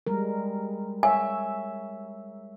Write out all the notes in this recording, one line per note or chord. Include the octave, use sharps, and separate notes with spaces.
G3 G#3 A#4
C#5 E5 G#5